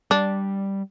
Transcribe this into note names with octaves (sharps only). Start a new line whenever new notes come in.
G3 D4